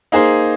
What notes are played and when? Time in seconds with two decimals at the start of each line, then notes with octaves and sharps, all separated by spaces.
0.12 A#3 D#4 G#4 C5